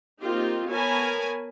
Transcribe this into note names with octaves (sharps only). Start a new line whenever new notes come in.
A#3 C4 D#4 F4 G4
B3 A#4 C#5 G#5 A5 B5